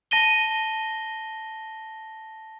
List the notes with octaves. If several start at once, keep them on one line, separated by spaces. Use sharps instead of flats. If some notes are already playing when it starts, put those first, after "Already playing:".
A5 A#6 D#7 G7